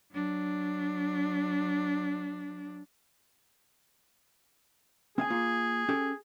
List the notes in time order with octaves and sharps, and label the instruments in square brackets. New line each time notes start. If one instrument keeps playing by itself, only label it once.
[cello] F#3 D4
[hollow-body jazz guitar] C4 F5 G#5 [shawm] G#4
[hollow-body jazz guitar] A#3 F4
C#4 G4 A4